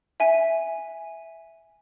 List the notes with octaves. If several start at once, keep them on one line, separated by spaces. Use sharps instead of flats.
E5 G#5